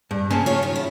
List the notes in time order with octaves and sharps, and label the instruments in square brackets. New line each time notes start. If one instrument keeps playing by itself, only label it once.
[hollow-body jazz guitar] G2
[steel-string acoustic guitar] C#3 A#3 C4 [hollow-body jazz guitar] G#5 A5
[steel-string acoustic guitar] F4 C#5
D#3
E4